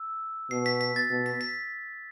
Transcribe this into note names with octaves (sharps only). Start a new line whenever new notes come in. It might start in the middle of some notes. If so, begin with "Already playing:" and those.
Already playing: E6
B2 C7
B6
B6
A6
B2
B6
B6